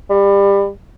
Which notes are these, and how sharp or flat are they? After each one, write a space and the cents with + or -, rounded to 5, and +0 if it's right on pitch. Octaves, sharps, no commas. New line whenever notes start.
G3 +25